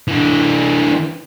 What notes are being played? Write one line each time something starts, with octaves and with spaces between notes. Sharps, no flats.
E3 D4